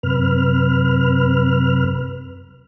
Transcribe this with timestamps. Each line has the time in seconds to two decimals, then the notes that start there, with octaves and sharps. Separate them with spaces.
0.03 F#2 C3 B4 F6